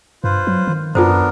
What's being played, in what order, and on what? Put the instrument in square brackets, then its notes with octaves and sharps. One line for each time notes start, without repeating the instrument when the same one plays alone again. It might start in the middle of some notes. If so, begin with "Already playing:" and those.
[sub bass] G2 [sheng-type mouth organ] F4 B4 C5
[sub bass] F#3
D#3
[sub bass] F#2 [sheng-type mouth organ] B3 D4 A#4 [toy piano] F4 A4 C5